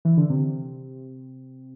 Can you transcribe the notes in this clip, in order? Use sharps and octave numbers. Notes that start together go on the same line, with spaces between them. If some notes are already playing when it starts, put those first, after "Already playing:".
E3
D3
C3